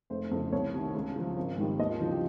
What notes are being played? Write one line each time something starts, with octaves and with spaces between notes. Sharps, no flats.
F1 C5
F2 C#3
C2 C#5
C3 D#3
C#2
C#3 F3
G#1
G#2 D#3 G3
D#2 D#5
F4
C#3 F3 D#4
G4